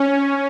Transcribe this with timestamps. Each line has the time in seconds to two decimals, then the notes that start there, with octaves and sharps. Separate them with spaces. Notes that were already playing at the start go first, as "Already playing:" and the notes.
Already playing: C#4